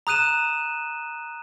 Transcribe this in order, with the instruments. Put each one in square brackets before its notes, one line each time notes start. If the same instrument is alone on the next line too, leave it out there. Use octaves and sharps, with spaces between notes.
[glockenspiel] A#5 D#6 F#6 D#7 E7